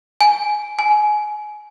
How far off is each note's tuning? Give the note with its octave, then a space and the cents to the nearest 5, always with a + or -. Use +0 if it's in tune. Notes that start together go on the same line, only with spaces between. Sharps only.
G#5 +10
G#5 +20